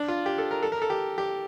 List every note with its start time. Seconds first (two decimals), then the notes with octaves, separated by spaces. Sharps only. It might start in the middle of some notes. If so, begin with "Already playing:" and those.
Already playing: D4
0.08 F4
0.26 G4
0.38 A4
0.51 A#4
0.63 A4
0.72 A#4
0.82 A4
0.90 G4
1.18 G4